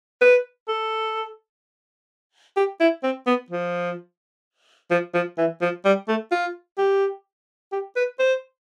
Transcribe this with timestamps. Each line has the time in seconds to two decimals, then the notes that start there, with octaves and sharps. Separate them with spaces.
0.21 B4
0.68 A4
2.57 G4
2.80 E4
3.03 C4
3.27 B3
3.50 F3
4.91 F3
5.14 F3
5.38 E3
5.62 F3
5.85 G3
6.08 A3
6.32 F4
6.78 G4
7.72 G4
7.96 B4
8.19 C5